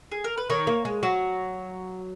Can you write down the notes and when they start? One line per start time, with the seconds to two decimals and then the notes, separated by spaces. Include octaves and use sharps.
0.12 G#4
0.24 A#4
0.38 B4
0.50 D#3 A#4 C#5
0.67 A#3
0.85 G#3
1.03 F#3 F#4